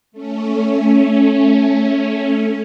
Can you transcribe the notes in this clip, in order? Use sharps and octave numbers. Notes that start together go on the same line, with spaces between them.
A3 C#4